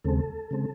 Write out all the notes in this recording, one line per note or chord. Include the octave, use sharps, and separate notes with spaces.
D#2 C#3 G#3 C4 A4
C#3 G#3 C4